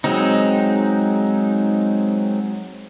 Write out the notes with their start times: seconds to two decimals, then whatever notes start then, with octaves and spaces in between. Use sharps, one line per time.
0.04 F#3 G#3 C4 D#4